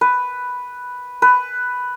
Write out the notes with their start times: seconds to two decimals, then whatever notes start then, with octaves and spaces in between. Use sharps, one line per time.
0.01 B4
1.22 B4